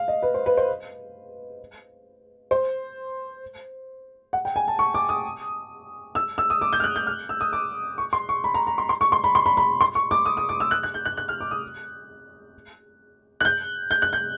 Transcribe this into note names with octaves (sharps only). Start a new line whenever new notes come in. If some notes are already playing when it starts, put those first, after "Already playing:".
Already playing: F5
D#5
B4
C5
B4
C5
C5
F#5
G5
G#5
A5
C#6
D6
D#6
E6
E6
D#6
D6
G6
F6
F#6
G6
F6
E6
D#6
D6
C#6
C6
C#6
B5
A#5
A#5
C6
C6
C#6
C6
B5
C6
B5
B5
C6
C#6
D6
D#6
D#6
D6
E6
F#6
F#6
G6
F#6
F#6
F6
D6
D#6
F#6
G6
G6
F#6
G6